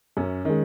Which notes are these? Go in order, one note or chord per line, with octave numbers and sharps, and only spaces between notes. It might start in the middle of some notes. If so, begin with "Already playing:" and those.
F#2 C#4
D#3 G#3